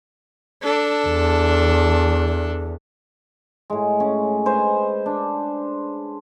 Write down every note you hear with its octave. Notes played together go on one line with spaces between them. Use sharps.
D4 A4
E2
A2 G#3
C#4
G#3 B4 C5 G#5
D4